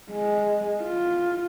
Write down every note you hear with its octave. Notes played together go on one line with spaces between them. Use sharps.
G#3
F4